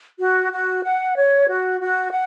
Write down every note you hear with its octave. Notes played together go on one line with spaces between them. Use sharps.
F#4
F#4
F#5
C#5
F#4
F#4
F#5